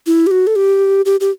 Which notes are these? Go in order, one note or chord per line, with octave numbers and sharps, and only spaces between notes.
E4
G4
F#4
A4
G4
G4
G4